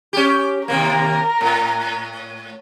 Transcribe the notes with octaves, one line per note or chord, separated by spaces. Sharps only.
C#4 G4
D#2 C3 A#3 A#4
A2